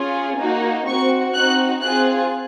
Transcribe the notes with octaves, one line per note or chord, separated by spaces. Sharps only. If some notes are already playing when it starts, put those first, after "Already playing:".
Already playing: C#4 F4 G#4
A#3 D#4 F#4
C4 F#4 C#6
C4 D#4 F#4 F#6
C4 F4 G#4 F#6